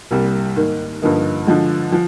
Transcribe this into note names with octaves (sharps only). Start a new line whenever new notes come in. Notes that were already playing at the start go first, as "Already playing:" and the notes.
C2 C3 G3 A#3
G#2 D#3 A#3
G2 D3 F3 A#3 D#4
D3 F3 G#3
F3